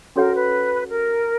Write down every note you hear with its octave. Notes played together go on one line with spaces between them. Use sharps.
C#4 F#4 A4 A#4 C#5 F#5
B4
A#4